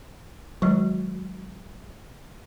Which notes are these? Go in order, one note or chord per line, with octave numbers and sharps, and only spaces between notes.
D#3 F#3 G#3